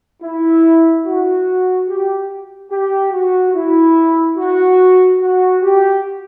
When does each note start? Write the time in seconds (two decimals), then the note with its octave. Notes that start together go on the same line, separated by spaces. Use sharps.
0.23 E4
1.06 F#4
1.89 G4
2.71 G4
3.13 F#4
3.54 E4
4.37 F#4
5.20 F#4
5.63 G4